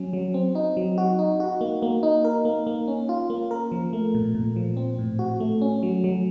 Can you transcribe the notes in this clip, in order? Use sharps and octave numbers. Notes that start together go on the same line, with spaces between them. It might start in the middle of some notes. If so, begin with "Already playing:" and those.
Already playing: F#3 C#4
F#3
C4
D#4
F#3
F#4
D#4
F#4
A#3
A#3
D#4
A#4
A#3
A#3
C#4
F4
A#3
A#4
F3
A3
A#2
A#2
F3
C4
A2
F#4
A3
C#4
F#3
F#3